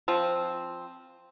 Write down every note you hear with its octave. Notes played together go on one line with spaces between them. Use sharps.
F3 C4